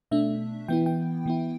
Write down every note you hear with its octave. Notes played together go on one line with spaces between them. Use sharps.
B2 A3 D4 E5
E3 B3 E4 G5
G5
E3 B3 E4